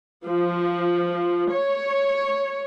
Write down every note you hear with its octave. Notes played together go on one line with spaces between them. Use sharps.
F3
C#5